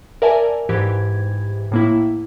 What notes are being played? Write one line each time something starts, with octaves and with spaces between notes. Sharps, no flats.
A#4 D5 E5 G#5 A5
G#2 E3 G4 G#6
A2 A#3 E4